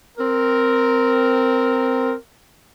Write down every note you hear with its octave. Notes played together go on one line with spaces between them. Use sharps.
C4 A#4